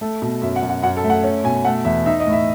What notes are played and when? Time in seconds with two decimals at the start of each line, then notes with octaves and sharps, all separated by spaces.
0.01 A3 A4
0.22 B2
0.42 F#2 E5
0.56 F#5
0.63 F#2
0.69 F#5
0.83 F#2 F#5
0.97 A4
1.04 A3
1.10 F#5
1.24 C#4
1.44 B2 G#5
1.65 A3 F#5
1.85 E2 E5
2.06 D#4 E5
2.20 D#5
2.27 A2
2.32 E5